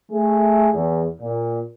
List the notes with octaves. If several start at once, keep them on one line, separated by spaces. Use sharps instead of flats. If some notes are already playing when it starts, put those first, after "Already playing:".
A3 G#4
E2
A#2